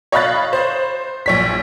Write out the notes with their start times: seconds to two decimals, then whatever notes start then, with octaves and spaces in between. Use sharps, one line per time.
0.12 C#5 D#5 F5 B5 F#6 A6
0.53 C5
1.26 A#1 C#5 B6